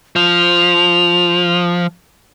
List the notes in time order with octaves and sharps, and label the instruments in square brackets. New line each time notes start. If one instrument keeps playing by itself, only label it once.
[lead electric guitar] F3 [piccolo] F7